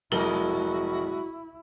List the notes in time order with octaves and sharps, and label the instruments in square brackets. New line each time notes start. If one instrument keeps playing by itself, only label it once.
[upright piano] F1 A#4 G7 [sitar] F#3 G#3 D#5 [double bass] E4 [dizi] F#4